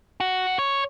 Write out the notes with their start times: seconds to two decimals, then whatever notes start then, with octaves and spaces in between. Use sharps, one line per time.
0.20 F#4
0.59 C#5